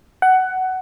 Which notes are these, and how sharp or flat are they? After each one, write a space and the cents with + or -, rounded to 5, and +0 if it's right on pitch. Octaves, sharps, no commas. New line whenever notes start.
F#5 +15